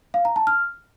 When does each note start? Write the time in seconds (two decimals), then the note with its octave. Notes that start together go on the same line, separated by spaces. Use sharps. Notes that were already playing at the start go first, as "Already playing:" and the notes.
0.14 F5
0.25 A#5
0.36 A5
0.47 F6